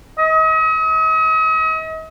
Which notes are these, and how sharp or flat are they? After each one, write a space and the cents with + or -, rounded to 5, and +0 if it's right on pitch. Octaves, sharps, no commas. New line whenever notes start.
D#5 +40